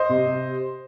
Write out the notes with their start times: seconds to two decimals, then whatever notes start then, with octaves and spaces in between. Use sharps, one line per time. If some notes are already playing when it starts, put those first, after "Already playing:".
Already playing: C5 D#5
0.09 C3
0.26 C3